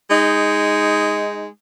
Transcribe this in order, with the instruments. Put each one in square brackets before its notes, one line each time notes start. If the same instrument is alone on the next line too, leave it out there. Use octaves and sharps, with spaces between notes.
[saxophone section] G#3 D#4